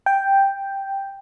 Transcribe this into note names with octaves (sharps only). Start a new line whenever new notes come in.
G5